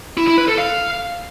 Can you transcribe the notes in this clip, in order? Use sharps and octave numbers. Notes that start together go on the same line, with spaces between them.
E4
E4
B4
A4
F5